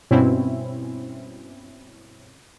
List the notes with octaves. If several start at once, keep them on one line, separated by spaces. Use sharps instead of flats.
G2 B2 C4 C#4 E4